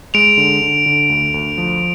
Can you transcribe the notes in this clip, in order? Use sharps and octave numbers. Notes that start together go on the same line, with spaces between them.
G#3 D7 F7
D3
D3
D3
D2
D2
F3